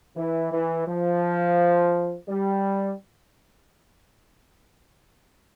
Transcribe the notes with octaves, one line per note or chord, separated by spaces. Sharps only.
E3
E3
F3
G3